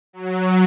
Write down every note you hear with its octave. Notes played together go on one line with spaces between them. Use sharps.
F#3